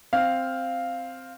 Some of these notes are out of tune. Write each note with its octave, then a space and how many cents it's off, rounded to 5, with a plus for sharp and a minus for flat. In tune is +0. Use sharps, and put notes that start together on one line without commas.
C4 +0 F5 +0